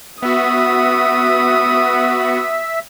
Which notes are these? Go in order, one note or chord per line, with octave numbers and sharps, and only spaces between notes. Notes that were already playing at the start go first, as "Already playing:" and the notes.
B3 F#4 E5 D#6